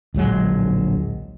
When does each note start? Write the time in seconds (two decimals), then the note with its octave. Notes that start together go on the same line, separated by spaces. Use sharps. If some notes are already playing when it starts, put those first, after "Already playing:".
0.14 D1 A#1 F#3 G#3